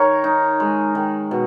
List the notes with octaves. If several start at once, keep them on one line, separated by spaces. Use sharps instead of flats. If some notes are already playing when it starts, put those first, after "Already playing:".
Already playing: D#3 A#4 C#5
D#4
G#3
D#3
B2